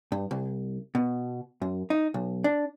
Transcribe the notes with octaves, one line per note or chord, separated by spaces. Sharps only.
G2
C2
B2
F#2
D#4
B1
D4